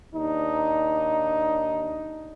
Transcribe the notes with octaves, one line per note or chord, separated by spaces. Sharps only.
D#2 D4 D#4